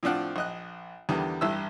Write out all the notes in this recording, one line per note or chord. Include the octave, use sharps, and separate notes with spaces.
A2 F3 C4 D4 F4 F#5
A#1 D#5 F#6
E2 D3 D#3 G3 B3
A1 G2 E4 E6